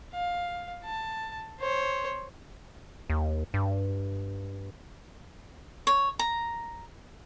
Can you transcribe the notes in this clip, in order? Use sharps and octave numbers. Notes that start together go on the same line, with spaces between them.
F5
A5
C5 C#5
D#2
G2
C#5
A#5